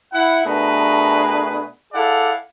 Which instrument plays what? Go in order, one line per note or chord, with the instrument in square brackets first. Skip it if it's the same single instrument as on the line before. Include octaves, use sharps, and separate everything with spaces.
[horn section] E4 F#5
B2 A3 D4 G#4 A#4 B4
E4 G#4 A4 D5 F5 F#5